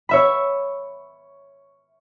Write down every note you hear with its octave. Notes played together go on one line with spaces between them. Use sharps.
C#5 E5 B5